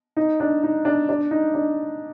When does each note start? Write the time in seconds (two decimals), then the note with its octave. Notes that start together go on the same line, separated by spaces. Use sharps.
0.17 D#4
0.40 D4
0.63 D#4
0.85 D4
1.09 D4
1.31 D#4
1.54 D4